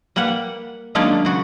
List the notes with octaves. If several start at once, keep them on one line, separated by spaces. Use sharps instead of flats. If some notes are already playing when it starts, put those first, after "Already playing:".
G3 A#3 B4 F#5
D#3 F#3 G#3 A#3 C#4 D4
C#3 F#4